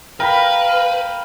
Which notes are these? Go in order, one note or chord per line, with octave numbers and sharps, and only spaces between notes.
A#4 B4 F5 G5 B5